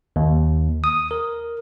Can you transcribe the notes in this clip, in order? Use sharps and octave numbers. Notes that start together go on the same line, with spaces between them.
D#2
D#6
A#4